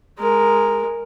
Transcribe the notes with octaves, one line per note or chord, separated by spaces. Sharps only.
G#3 A#4